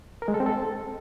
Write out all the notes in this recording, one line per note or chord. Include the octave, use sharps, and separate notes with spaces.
A#4
G#3
A4
C4
A4